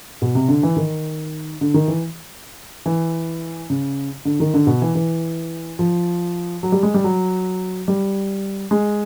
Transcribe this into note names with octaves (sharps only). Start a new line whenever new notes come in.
B2
C3
D3
E3
D#3
D3
D#3
E3
E3
C#3
D3
D#3
D3
B2
E3
E3
F3
F#3
G3
G#3
G3
F#3
G3
G#3